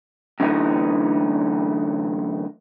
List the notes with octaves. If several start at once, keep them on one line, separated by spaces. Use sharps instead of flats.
F#2 D3 E3 A3 D#4